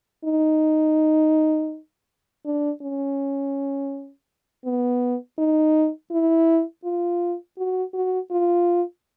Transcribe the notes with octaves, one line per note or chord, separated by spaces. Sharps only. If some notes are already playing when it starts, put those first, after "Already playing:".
D#4
D4
C#4
B3
D#4
E4
F4
F#4
F#4
F4